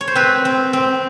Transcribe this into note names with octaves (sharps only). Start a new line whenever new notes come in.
C#5
C5
C4 B4
C4
C4